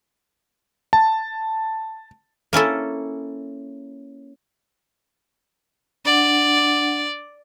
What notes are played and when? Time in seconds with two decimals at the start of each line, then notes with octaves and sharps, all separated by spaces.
0.93 A5
2.53 A#3 C#4 E4 A4
6.05 D4 D5 F#5